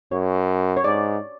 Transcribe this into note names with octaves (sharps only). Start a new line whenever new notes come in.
F#2 C#5
C#5
G#2 D5